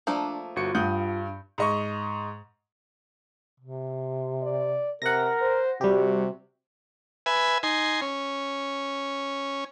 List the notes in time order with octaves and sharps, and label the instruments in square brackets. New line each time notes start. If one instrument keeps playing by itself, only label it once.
[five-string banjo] F3 A3 A#3 [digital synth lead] D4
[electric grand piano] G1 F#4 C#7 [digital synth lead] F4
[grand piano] G2 [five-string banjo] F#5 [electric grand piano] D#6 G6
[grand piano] G#2 D#5 C#6
[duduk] C3
[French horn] D5
[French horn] C3 [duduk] A#4 [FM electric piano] F#5 A#6
[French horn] C5
[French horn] C3 [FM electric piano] G3 G4 [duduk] F#4
[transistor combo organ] B4 E5 G#5
D#4 G#5 C6
C#4